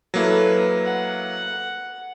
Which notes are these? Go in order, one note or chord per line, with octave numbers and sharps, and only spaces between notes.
F#3 A#3 E4 A4 B4
F#5